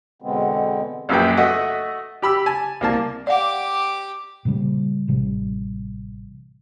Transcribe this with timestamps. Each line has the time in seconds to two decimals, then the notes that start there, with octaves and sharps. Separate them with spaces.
0.22 E2 B2 D3 G#3 B3 C4
1.09 A#1 F#2 A#2 B4 G5
1.37 A3 F#4 D#5 E5 F#5
2.22 G4 B5 E6
2.46 G#5 A5
2.81 C2 A#3 A5
3.27 G4 D5 F5 F#5 D6
4.45 A#2 C#3 F3 G3
5.08 A1 C3 G3